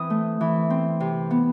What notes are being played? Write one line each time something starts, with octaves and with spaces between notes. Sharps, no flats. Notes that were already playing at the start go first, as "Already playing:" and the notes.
Already playing: E3 C4 D#6
A3
E3
C4
C3
B3